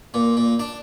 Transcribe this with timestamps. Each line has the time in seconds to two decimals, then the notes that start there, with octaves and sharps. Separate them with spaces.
0.14 A#2
0.37 A#2
0.59 D4